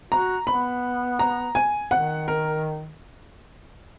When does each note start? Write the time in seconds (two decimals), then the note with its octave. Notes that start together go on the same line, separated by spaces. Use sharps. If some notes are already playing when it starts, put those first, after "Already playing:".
0.11 F#4 A#5
0.47 B3 B5
1.19 A#5
1.55 G#5
1.91 D#3 F#5
2.28 A#4